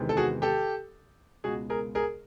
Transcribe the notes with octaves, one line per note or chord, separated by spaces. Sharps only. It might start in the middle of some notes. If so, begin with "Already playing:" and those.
Already playing: E2 C3 D#3 G#3 B3
A4
F#4 G#4
G4 A4
C#2 B2 G#3 F#4 G#4
G#4 A#4
G#4 A#4